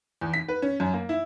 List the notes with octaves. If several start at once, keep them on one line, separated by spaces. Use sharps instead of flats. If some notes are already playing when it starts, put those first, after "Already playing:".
E2
B6
B4
C#4
F#2
A#3
E4